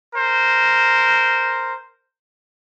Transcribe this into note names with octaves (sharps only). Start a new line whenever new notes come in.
A#4 C5